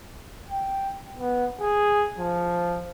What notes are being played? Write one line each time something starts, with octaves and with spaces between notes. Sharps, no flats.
G5
B3
G#4
F3